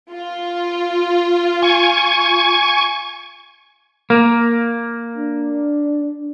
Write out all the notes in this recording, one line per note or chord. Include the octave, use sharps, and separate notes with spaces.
F4
G#5 C#6
A#3
D4